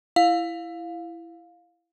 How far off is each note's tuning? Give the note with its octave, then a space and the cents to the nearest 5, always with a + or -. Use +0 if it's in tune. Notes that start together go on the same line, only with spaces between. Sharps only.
E4 +15 F5 +15